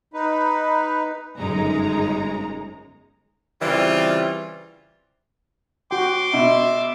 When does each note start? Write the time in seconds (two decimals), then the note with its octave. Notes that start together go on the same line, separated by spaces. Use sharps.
0.13 D#4 B4
1.38 G1 F#2 C#3 G#3 D#4 A#5
3.62 C#3 E3 G3 C4 F4
5.91 F#4 G5 C6 D6
6.33 B2 E5